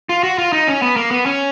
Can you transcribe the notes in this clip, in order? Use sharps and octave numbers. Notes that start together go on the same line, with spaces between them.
F4
F#4
F4
D#4
C#4
B3
A#3
B3
C#4